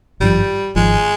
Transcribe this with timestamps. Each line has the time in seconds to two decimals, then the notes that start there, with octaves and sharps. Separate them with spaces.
0.20 G#1 G2 F3 G3
0.76 G#1 G#2 F3 G#3